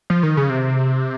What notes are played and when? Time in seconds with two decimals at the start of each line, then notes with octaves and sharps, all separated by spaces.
0.10 F3
0.23 D#3
0.37 C#3
0.50 C3